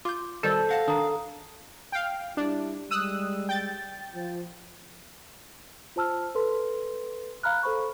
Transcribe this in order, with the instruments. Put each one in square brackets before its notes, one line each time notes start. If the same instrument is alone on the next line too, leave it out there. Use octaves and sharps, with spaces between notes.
[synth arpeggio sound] F4 G6 [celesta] D6
[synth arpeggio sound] B2 D#3 G3 [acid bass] A4 [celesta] C5 G6 E7
[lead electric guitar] F5 [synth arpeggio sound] F#5 A5 [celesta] A#6
[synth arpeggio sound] D#3 D4 [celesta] A#5 D#6
[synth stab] F5 G5
[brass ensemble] G3 E4 G4 [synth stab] D4
[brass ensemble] G3 G#3 [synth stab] D#6 E6 F#6
[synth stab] G5 G6 A6
[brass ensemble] F3
[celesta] F4 C5 A5 E6 F6
A4 B4 C6
F5 A#5 B5 F6 F#6
A4 C5 B5 C#6